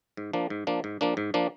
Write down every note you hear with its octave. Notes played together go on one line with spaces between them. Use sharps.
G#2
F3 A#3 D4
G#2
F3 A#3 D4
G#2
F3 A#3 D4
G#2
F3 A#3 D4